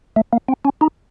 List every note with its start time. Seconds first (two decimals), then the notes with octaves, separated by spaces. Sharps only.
0.16 A3
0.33 A#3
0.48 C4
0.65 C#4
0.81 D#4